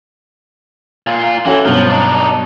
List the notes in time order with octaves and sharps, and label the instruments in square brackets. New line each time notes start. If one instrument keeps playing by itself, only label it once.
[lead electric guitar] A#2 F4
[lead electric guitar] E3 [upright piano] C#4 F#4 A4
[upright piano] G2 B2 F#3 [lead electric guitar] F3
[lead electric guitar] D4 D#4